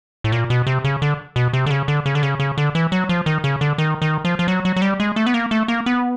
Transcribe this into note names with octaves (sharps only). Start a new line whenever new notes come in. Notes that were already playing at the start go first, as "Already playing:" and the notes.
A2
A#2
B2
C3
C#3
D3
B2
C3
D3
C#3
D3
C#3
D3
C#3
C#3
D3
E3
F#3
F3
D#3
C#3
D3
D#3
D#3
F3
F3
F#3
F#3
F#3
G3
G#3
A3
B3
A#3
A3
A#3
B3